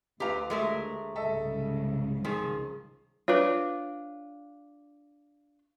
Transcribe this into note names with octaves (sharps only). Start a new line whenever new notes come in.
D2 F4 G4 B4 F5 A#5
G#3 A3 A#4 E5
C2 G#2 C#3 A4 D#5 E5
D#3 F3 G#4
D4 F4 B4 C#5